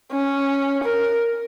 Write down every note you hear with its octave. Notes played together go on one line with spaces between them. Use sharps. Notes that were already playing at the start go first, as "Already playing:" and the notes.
C#4
A#4